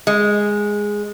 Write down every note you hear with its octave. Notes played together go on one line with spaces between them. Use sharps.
G#3